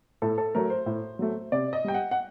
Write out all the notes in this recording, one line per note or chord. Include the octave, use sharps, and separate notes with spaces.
A2 A4
A4
F#3 A3 A#4
C5
A2
F#3 A3
C3 D5
D#5
G3 G5
F#5
F#5